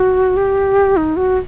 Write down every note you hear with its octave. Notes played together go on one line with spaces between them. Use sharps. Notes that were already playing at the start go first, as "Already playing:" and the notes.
Already playing: F#4
G4
D#4
F#4